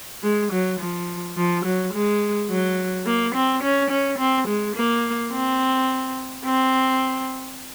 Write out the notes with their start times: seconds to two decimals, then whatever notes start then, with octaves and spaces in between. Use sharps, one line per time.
0.23 G#3
0.52 F#3
0.80 F3
1.37 F3
1.64 F#3
1.93 G#3
2.50 F#3
3.06 A#3
3.35 C4
3.63 C#4
3.90 C#4
4.18 C4
4.48 G#3
4.75 A#3
5.32 C4
6.45 C4